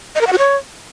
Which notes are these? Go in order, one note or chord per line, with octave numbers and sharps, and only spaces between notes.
D#5
A#4
F#5
F#4
C#5